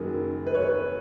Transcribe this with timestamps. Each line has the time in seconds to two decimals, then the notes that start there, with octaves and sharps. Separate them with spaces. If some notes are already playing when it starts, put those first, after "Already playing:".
Already playing: F#1 F#2 D#3 F#3 G#4
0.47 B4
0.54 C#5
0.62 B4